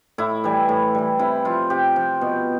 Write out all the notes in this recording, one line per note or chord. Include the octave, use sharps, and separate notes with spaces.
A2 E4
E3 G3
A2
E3 G3
C3 E4
F3 F4
C3 G4
F3
B2